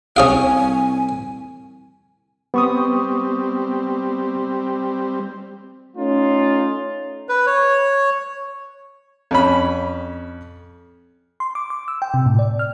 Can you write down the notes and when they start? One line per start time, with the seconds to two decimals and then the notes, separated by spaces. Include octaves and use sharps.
0.17 C2 C#4 G#4 F5 G#5
2.54 G3 B3 C4 C#6 D#6
5.96 A3 C#4 D#4 F4
7.29 B4
7.46 C#5
9.31 F2 C#4 B5
11.40 C6
11.55 D6
11.70 D6
11.88 E6
12.02 G5
12.14 C3
12.26 A2
12.39 D5
12.59 F6